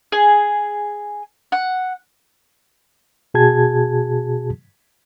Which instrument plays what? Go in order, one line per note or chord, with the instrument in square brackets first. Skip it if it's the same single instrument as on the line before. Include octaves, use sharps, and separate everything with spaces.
[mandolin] G#4
F#5
[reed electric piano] B2 F#4 G#4 A5 G#6